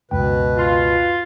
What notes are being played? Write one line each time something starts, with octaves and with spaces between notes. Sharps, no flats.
C#2 F#2 B2 B4 G5
F4